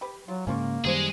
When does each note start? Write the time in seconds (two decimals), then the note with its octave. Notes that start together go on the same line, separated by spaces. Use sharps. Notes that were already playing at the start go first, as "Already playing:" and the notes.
0.01 G4 B4
0.28 F#3 F4
0.47 G#2 C#3 A#3 C#4 F4 C#6
0.84 F#2 D#3 G3 G#3 B3 G#4 C5